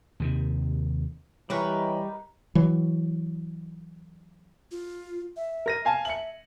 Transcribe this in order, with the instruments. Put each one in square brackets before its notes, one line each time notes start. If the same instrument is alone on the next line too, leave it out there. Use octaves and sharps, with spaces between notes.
[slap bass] D#2 C3 D#3
[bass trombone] E3 [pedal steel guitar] G3 G4 C#6 [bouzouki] D#4 A#4 B4 [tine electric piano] C#5
[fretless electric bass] E3 F#3
[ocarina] F4
E5
[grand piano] A#4 A#6 D#7
F5 G#5 A5
[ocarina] E5 [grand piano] C#7 F#7